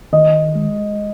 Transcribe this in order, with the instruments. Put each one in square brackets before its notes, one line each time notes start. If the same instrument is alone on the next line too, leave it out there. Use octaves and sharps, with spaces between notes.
[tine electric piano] D#3 [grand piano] D#5
[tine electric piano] G#3